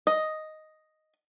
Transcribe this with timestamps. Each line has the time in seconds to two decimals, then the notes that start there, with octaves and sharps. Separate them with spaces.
0.07 D#5